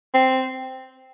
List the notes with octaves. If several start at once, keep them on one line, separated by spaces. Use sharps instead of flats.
C4